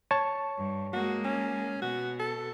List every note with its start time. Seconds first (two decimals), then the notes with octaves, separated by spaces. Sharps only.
0.11 C#5 A5 C#6
0.57 G2
0.93 G#3 A#3 F#4
1.25 C#4
1.82 B2 F#4
2.19 A4